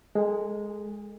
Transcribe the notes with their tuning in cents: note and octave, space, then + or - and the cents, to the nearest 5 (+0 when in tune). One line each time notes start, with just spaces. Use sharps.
G#3 +0 A4 +20 G#5 -40